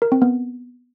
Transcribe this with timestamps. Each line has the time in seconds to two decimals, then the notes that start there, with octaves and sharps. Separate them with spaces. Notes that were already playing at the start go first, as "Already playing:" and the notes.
0.02 A#4
0.12 C4
0.22 B3